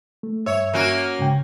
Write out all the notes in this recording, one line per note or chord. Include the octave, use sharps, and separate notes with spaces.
A3
G2 C#5 E5 E6
A#3 C#4 F#4
G#2 C#3 G5